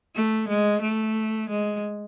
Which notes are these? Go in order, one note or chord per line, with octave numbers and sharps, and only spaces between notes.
A3
G#3
A3
G#3